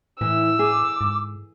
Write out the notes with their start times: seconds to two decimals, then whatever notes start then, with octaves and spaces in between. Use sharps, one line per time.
0.21 A2 E3 E6
0.59 G#4 D6
1.01 G#2